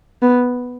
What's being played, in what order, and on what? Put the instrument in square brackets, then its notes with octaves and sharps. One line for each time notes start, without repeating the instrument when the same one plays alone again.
[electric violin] B3